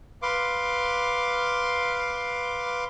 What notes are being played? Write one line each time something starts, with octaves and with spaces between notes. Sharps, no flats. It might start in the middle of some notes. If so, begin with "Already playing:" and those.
B4 F5 C6 D6